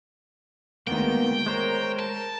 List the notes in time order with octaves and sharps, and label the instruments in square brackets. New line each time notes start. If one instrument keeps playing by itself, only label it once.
[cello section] D2 D#3 G#3 [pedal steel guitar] A#3 B3 [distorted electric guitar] G5
[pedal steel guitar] G#3 C5 C#5 [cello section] A#4
[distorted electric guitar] A5